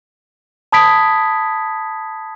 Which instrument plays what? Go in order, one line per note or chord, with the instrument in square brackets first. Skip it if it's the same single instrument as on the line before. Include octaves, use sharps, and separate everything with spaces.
[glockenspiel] A5 B5 D#6 G#6 B6 D7